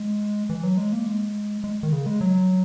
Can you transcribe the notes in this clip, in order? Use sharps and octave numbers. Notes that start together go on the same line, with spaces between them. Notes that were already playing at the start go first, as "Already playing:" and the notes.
Already playing: G#3
E3
F#3
G#3
A#3
G#3
G#3
D#3
C#3
G#3
F#3